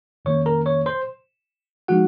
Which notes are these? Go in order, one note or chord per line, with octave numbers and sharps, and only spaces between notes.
F2 D#3 A#3 C#4 C#5 C#6
A#4 A#5
C#5 C#6
C5 C6
F3 G#3 D#4 F#4 F#5